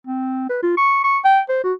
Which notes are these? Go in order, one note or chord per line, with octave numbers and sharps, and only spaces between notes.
C4
B4
F4
C#6
C#6
G5
C5
F#4